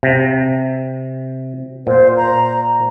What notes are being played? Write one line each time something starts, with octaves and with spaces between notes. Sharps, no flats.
C3
A#2 C5
A#5